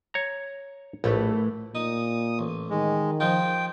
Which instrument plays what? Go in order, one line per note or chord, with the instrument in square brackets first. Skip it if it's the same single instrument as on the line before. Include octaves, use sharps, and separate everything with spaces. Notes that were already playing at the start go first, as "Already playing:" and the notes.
[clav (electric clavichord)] C#5 A#5
[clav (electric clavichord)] A#1 [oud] A2 E3 A3
[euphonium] A#2 [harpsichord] D#4 [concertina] D#6
[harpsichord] A1
[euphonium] D#3 [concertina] G#3
[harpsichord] F3 D#4 F4 [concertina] G5